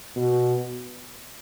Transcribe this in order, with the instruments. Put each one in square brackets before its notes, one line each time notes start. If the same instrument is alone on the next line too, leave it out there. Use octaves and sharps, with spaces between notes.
[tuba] B2